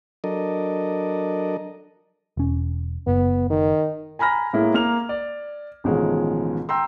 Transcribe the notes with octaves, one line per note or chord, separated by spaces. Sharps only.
F#3 D4 A4 A#4 D#5
E1 C#4
F#1 B3
D#3
G#5 A#5 B5 F6 A#6
A2 G#3 A#3 E4
A#3 F6 F7
D5
A1 B2 D#3 F3 G#3
G5 A#5 C6 E6